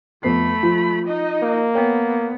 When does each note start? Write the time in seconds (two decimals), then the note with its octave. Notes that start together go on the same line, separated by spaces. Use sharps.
0.23 F2 A3 B3 B5 C7
0.63 F3
1.06 D#4 D#5
1.42 A#3
1.75 B3 A#4 C#5 G5